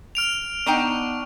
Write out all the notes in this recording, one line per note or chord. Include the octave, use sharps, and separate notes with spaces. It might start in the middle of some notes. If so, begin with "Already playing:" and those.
F6 D7 F7
B3 D4 D#4 G5 C#6